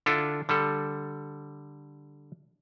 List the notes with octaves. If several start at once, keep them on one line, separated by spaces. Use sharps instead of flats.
D3 D4 E4 F4 A4
D3 G3 A4